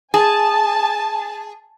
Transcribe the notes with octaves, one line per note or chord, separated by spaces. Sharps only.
G#4 G#5 A5